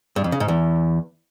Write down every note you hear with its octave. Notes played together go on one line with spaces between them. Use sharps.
G2
F2
C#3
G#2
E2